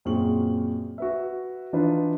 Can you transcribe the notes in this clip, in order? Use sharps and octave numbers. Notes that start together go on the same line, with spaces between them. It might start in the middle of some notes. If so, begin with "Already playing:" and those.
F#2 A#2 C4 G#4 C#6 F#7
F#4 B4 E5
E3 D4 D#4 F4 B4